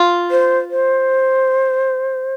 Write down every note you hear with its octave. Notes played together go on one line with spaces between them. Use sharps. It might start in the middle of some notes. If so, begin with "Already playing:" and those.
Already playing: F4
C5
C5